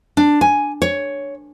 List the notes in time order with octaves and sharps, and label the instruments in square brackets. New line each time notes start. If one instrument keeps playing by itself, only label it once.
[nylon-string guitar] D4
G#5
C#5